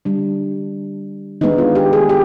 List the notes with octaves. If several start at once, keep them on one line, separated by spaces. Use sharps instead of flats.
D3 G3 D4
D#3 G#3 B3 D4 D#4
F4
G4
G#4
G4